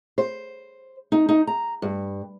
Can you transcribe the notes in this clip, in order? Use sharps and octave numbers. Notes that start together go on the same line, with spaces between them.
C5
D#4
D#4
A#5
G2